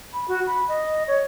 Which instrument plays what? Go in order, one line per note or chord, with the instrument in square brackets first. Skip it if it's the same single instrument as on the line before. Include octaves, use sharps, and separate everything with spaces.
[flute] B5
F#4
B5
D#5
C#5